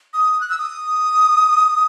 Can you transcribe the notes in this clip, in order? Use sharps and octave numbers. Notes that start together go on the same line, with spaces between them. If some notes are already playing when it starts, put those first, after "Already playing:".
D#6
F#6
E6
D#6